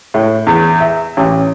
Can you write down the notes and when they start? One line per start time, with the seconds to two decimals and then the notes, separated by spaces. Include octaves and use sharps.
0.14 A2
0.47 E2
0.80 E5
1.17 A1